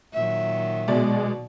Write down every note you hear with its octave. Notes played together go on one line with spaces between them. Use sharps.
A#2 D#3 F#3 E5
B2 G#3 D5